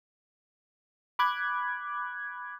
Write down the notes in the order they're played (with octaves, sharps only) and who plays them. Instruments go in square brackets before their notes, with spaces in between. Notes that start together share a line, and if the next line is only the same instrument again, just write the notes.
[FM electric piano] B5 D6 F#6 G#6